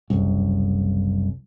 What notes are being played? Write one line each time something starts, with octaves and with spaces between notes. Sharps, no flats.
F#1 C2